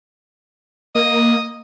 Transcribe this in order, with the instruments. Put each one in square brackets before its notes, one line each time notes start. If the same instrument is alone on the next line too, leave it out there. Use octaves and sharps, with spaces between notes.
[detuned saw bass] A#3 [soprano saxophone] D#5